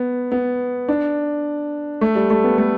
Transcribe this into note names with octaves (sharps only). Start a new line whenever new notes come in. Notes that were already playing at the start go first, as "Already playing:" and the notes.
Already playing: B3
B3
D4
A3
G3
A3
B3
A3